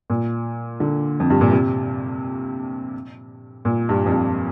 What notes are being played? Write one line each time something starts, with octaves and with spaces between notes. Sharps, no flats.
A#2
D3
F2
G2
A#2
C3
A#2
G2
F2
G2